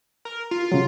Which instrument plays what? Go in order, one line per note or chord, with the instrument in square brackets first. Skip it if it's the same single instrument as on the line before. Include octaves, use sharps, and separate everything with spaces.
[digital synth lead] A#4
F4
[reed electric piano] C#3 F#3